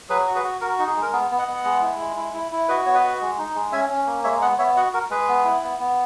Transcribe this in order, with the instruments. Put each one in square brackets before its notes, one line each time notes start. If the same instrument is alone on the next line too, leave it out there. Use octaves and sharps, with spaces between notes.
[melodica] F#3 G#4 B4
F#4
G#4 B4
F#4
F#4 A#4
D#4
G#4
G#3
A#4
B3 G#4
B3
D#5 F#5
B3
G#3
E4
G#3
E4
E4
E4
F#4 B4 D#5
B3 C#5
B4 D#5
F#4
G#3
D#4
G#3
C#4 E5 G#5
C#4
A#3
G#3 C#5 E5
B3 D#5 F#5
B3 C#5 E5
F#4 D#5 F#5
F#4 A#4
G#3 G#4 B4
B3
E4
B3
B3